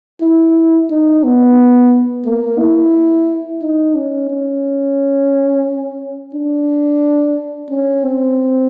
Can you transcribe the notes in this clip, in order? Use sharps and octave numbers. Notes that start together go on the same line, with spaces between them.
E4
D#4
B3
A#3
E4
D#4
C#4
C#4
D4
C#4
C4